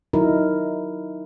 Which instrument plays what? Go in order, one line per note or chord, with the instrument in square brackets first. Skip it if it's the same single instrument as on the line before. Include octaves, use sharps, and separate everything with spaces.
[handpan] D#3 F#3 D#4 E4 A#4